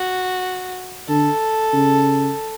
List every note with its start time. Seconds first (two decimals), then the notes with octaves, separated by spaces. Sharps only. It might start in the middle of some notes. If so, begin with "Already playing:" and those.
Already playing: F#4
1.08 D3 A4
1.73 C#3